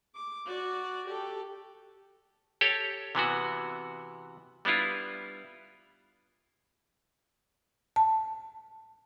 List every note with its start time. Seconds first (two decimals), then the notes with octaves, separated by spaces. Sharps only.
0.15 D6
0.46 F#4 D5
1.07 G4 A4
2.61 G4 A4 C#5
3.15 C3 E3 B3 F#4
4.65 G3 B3 D4 E4 F4
7.96 A5